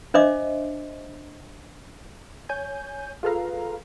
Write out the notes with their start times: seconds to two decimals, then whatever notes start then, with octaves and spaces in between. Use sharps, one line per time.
0.14 D4 C5 D#5 E5 D6
2.49 C#5 G#5 G6
3.23 F4 G#4 A4 B4 F5 A#5